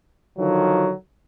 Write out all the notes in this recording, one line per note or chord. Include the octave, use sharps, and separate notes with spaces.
D3 D#3 F3 F#3